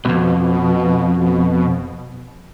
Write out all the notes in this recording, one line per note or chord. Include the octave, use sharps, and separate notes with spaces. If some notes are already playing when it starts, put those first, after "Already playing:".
C2 F2 B2